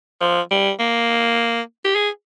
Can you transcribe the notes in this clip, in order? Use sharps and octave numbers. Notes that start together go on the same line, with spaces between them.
F3
G3
A#3
G4
G#4